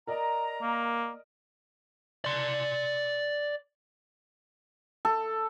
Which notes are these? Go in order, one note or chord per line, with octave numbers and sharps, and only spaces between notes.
A#4 D5 D#5 A#5
A#3
D5 C6
A4